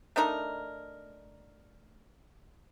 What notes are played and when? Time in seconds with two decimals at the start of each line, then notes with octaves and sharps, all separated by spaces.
0.16 A3 D4 D#4 A#4